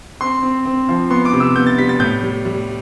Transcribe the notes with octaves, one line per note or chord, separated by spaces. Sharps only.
C4 C6
C4
C4
F3
B3 C6
D6
C3
E6
B3 G6
A6
G3 B6
A6
A2 G6
G3
G3